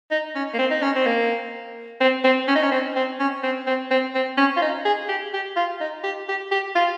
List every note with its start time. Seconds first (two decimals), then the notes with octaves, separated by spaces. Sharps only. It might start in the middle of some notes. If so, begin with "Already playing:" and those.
0.11 D#4
0.35 C#4
0.54 A#3
0.58 C4
0.71 D#4
0.82 C#4
0.96 C4
1.06 A#3
2.01 C4
2.24 C4
2.48 C#4
2.56 D#4
2.63 C#4
2.71 C4
2.96 C4
3.20 C#4
3.43 C4
3.67 C4
3.91 C4
4.15 C4
4.38 C#4
4.57 F4
4.62 D#4
4.85 G#4
5.09 G4
5.34 G4
5.56 F4
5.81 D#4
6.04 G4
6.28 G4
6.52 G4
6.76 F4